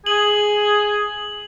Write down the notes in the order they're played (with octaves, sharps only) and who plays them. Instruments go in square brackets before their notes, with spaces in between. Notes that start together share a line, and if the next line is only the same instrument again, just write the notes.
[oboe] G#4 [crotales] F#7